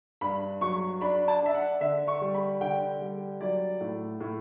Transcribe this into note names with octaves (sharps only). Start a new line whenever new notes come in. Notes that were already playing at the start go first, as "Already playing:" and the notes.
G2 B5
F#3 C#6
D4 B5
A5
D4 E5
F#5
D3 E5
C#6
G3
B5
D3 G5
G3
F#3 D5
A2
A2